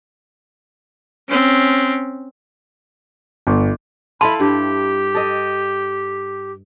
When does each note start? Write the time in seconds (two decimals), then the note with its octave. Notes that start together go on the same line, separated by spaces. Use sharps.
1.29 C4 C#4
3.47 G1
4.21 E4 A4 F5 A5 B5 C6
4.40 G2 G4
5.15 A4 D#5